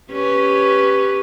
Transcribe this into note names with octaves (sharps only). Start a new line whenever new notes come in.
C#4 G4 B4